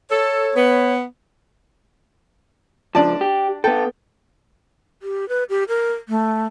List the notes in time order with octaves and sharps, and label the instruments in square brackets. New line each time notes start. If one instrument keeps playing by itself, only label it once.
[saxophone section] A4 [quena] C#5
[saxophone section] B3
[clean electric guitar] C#2 F3 [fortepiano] D4 D5 A5
[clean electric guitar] G4
[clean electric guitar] B3 A4 [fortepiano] G5
[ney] G4
B4
G4
A#4
A3